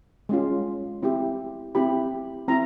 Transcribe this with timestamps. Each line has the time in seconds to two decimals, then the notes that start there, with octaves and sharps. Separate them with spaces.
0.29 G#3 C#4 F4
1.03 C4 E4 G4
1.75 C4 E4 G4 B5
2.48 C4 E4 A#5